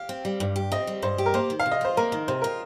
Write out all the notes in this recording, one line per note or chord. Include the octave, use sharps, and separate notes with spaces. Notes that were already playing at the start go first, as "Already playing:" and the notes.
Already playing: G4 F5
C4
G3
G2
G4
C4 D#5
G3
G2 C5
G4
A#4
A#3 C5
D#3
F5
C3
D#5
F4 C5
A#3 A#4
D#3
C3 C5
F4 A#4